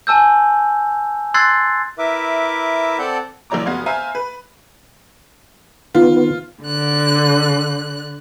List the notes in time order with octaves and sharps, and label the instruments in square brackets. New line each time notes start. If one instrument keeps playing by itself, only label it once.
[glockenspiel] G#5 A5 E6 G6
C6 E6 F#6 G#6 A6 C7
[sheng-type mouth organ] E4 A#4 B4 E5 D6
C4 A4 D5 F#5 A5 G6
[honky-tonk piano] A#1 E3 F#3 C#5 A#5 D6
F1 B3 F#4 F5 C6 G#6
C5 E5 F5 G#5 A#5
B4
[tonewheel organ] D#3 B3 [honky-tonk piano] F4
[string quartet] D3 F#6